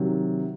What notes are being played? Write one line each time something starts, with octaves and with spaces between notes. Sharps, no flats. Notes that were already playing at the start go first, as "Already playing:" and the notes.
Already playing: C3 D#3 F#3